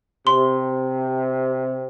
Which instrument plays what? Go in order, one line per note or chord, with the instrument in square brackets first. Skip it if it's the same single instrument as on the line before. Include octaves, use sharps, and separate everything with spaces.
[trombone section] C3 [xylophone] C6